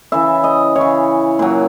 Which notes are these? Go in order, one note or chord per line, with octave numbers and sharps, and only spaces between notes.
C#3 E3 E5
D#5
E3 C#5
C#3
A#2 F#3